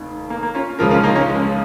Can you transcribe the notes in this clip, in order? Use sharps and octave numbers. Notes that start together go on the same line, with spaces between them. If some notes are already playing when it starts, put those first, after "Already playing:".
Already playing: F1 D#2 D#3
A#3
A#3
C#4 F4
C#2 C#3 F3 F4 A#4
C#4 F4
A#3 D#4
G#3 C#4
G#3